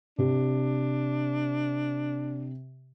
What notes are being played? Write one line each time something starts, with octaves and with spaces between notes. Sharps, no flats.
C3 D4 G4